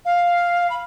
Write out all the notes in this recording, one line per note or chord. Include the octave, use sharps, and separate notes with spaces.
F5
B5